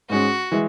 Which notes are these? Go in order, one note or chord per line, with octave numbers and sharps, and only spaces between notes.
G#2 G#3 C#4 F#4
E3 G#3